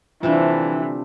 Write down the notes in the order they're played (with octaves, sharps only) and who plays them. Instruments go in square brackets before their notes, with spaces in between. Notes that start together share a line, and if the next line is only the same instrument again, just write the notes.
[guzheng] C3 G3 A3 [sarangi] E3 [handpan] D4 F4